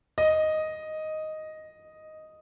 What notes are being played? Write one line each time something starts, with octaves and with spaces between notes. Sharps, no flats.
D#5